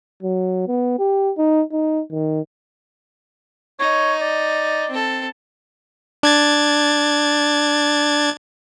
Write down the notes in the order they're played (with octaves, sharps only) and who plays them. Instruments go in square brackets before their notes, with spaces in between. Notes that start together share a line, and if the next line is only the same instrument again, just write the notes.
[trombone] F#3
B3
G4
D#4
D#4
D#3
[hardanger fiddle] D#4 [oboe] C#5
[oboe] D5
[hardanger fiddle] C4 A4
[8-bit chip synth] D4 G#6 A6